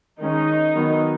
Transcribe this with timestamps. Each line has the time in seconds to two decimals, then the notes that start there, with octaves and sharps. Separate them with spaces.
0.20 D#3 G#3 C#4 D#4
0.75 D#3 F#3 B3